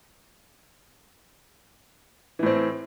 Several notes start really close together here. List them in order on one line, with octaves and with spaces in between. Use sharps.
E3 A2 C4